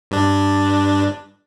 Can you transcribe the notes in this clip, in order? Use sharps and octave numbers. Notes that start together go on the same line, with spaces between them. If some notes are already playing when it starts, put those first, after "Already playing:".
G2 D4